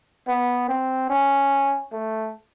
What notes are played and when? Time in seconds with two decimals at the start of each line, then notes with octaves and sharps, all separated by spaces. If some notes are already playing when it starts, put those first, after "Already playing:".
0.28 B3
0.69 C4
1.09 C#4
1.93 A3